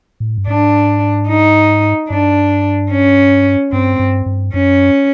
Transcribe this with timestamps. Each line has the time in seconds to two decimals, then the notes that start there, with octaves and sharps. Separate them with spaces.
0.20 A2
0.38 G2
0.48 G#2 D4
1.29 D#4
2.09 G2 D4
2.91 C#4
3.72 G2 C4
3.99 G2
4.26 G2
4.54 F#2 C#4